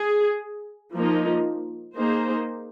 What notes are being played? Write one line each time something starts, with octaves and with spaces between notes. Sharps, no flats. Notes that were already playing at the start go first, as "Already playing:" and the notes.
Already playing: G#4
F3 A#3 D#4
A#3 D#4 G#4 C5